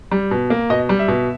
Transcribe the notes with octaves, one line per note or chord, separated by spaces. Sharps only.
G3
B2
A#3
B2 D#5
G3
E5
B2